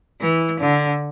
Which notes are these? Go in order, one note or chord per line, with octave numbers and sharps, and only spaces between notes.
E3
D3